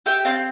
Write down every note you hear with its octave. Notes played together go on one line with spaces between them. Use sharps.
G4 E5 G5
C4 F5 A5